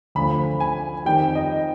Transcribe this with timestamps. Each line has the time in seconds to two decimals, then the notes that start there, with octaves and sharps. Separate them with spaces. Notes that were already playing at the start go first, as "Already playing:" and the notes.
0.15 D2 D3 F3 B5
0.60 G#5
1.05 F2 D#3 G3 G5
1.35 D#5